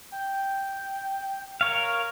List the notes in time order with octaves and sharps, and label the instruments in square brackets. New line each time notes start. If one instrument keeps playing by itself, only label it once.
[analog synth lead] G5
[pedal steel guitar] A#4 C#5 F5